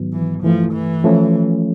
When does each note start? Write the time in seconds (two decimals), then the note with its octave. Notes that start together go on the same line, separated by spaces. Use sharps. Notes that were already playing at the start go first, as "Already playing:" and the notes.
Already playing: G#2 D#3 F#3 B3
0.13 E3
0.43 G2 E3 F3 A3
0.73 E3
1.04 F3 A3 C#4